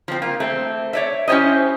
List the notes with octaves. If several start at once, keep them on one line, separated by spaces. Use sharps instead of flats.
F3 C4
A#3 F4
A3 C4
C#5 D5 E5
C#4 E4 G4 C5 D#5